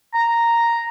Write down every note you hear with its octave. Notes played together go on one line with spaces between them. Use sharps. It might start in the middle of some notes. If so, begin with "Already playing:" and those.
A#5